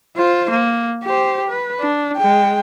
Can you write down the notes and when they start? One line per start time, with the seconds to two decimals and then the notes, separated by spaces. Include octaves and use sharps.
0.17 F4 C5
0.51 A#3
1.04 G4 C5
1.48 B4
1.80 D4
2.17 G#3 G5